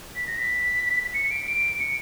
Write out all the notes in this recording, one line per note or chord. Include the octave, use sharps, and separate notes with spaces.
B6
A#6
B6
C#7
D7
D7
C#7